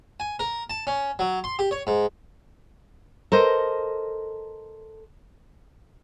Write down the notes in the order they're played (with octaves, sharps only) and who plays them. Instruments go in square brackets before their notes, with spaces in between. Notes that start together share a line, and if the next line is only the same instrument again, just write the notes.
[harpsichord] G#5
A#4
A5
C#4
F#3
C6
G4
C#5
G#2
[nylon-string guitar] A4 A#4 C5 D#5